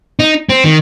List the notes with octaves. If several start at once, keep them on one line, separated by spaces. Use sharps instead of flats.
D#4
C4
D#3